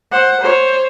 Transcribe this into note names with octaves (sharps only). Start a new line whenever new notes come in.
C5 F#5
C5 C#5